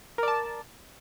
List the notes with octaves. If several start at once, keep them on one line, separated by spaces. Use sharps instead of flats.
A#4 D5 A5